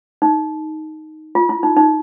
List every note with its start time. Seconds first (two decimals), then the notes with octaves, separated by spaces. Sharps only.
0.22 D#4
1.35 F4
1.49 E4
1.63 D#4
1.77 D#4